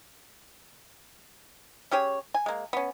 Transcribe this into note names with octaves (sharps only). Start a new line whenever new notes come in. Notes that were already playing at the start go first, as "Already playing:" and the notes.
C#4 G4 G#4 C#5
G#5
G#3 A#3
B3 C#4